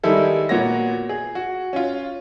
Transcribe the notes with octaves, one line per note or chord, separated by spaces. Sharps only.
D#3 G3 G#3 E4 A4
A#2 B3 F#4 C#5 A#6
G#4
F#4
C#4 F4